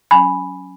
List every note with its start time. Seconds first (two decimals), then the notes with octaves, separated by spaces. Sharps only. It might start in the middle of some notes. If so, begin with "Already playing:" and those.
0.11 F#3 C#4 G#5 B5